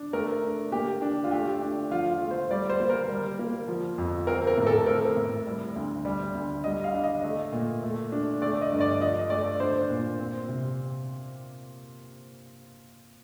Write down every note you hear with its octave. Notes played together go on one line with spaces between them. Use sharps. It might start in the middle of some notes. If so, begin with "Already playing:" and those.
Already playing: D4
A3 A#4
D4
A#3 G4
D4
F4
A3 G4
D4
F3 F4
F4
A3
C5
G3 D5
C5
A#3
A#4
G3
A#3
F3
F2
C4 A#4
A#4
A2
A4
C4 A#4
A2
G3
D2
G3
D2
G3 D#5
F5
D4
D#5
A3
A#2
A3
D4
A3 D5
D#5
G2
D5
F3 D#5
A3 D5
D4 C5
A#2
C4
C3